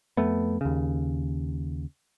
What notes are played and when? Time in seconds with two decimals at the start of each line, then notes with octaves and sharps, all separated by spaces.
0.17 F2 A3 B3
0.61 D#2 C#3